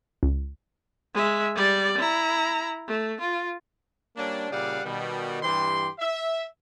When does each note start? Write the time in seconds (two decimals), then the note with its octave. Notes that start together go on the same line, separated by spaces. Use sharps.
0.23 C#2
1.14 G#3 E5
1.56 G3 D5
1.98 E4 A#5
2.88 A3
3.21 F4
4.17 G3 A#3 C#4 D4
4.51 A#2 C#3 G3 D5 F5 F#5
4.85 B2 D#3 G3
5.43 G2 E3 G4 C6
5.99 E5